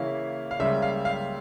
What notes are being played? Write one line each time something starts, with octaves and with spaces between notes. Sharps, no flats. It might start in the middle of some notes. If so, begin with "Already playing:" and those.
Already playing: C#3 E3 A#3 C#4 E4 F5
F5
C#2 C#3 G3 A#3 E5
F5
F5